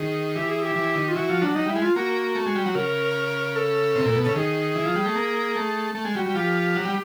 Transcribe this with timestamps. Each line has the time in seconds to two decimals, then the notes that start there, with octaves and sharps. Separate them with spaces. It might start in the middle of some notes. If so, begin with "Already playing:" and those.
Already playing: D#3 G#4
0.36 E3 G4
0.49 G#4
0.62 G4
0.76 E3
0.96 D#3
1.09 F4
1.15 E3 F#4
1.29 F3
1.42 F#3 D4
1.55 F#3 D#4
1.66 G3 E4
1.76 G#3
1.82 F4
1.96 A#3 F#4
2.35 A3
2.46 G#3
2.55 G3
2.66 F#3
2.75 C#3 A#4
3.56 A4
3.95 C3
4.05 A#2
4.16 B2
4.24 C#3 A4
4.35 D#3 G#4
4.76 E3
4.85 F3
4.96 G3
5.06 A3
5.16 A#3
5.56 A3
5.95 A3
6.05 G#3
6.15 G3 F#4
6.26 G3
6.35 F3 G4
6.76 F#3
6.85 G3